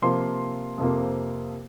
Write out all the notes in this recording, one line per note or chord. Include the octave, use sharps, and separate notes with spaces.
C3 F3 A#3 C6
F2 C3 F3 A#3